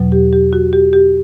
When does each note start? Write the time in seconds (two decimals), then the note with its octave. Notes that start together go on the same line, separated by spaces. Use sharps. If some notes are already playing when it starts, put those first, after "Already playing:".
Already playing: E2 B2 F#3
0.12 G4
0.33 G4
0.53 F#4
0.73 G4
0.93 G4